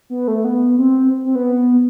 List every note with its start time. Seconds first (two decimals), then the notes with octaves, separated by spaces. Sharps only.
0.10 B3
0.28 A3
0.44 B3
0.79 C4
1.25 C4
1.35 B3